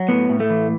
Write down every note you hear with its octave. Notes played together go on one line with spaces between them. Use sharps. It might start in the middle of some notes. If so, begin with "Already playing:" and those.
Already playing: F#3
A2 B3
A2
A3
E3